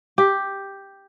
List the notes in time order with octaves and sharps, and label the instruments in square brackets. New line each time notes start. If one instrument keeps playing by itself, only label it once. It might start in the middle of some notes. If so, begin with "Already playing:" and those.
[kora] G4